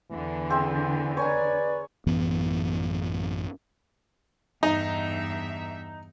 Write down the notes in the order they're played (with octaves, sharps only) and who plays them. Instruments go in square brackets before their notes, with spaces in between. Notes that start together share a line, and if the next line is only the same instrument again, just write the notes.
[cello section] E2 D3 [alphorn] E3
[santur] C4 G#4 E5
[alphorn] B4 [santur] C#5 G#5 A#5 [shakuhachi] D5
[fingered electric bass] A1 F#2 E3 B3
[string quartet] E2 G2 E5 [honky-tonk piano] D#4